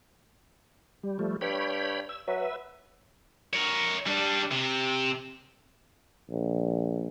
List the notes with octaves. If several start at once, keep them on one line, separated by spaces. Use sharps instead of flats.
G3
F3 G3 A3
G2 C#5 G5 B5
E6
F#3 B4 E5
A#4 C#5
G3 D4
C3
A#1